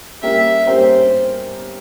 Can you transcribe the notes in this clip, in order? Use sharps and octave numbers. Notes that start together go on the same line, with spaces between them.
G3 A#3 C#4 G4 A#4 E5
G3 A#3 C#4 G4 A#4 C5